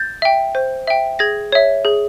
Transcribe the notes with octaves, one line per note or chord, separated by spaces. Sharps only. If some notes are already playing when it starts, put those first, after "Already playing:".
Already playing: G6 A6
E5 G5
C5
E5 G5
G#4 G#6 A#6
C#5 E5
G#4